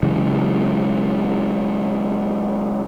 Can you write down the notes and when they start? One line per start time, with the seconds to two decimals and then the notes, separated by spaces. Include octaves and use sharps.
0.03 C#3 E3 F#3 G#3